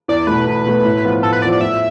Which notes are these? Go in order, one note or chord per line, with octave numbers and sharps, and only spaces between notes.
E2 D5
B2 A3 B4
E2
B2 A3
A2
F3 B3 F4
A2 A4
B4
F3 B3 F4 D5
D5
A2 E5